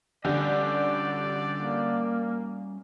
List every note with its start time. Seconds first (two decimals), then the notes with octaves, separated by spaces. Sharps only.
0.25 D3 G3 C#4 G4 D5 D#5
1.56 A#3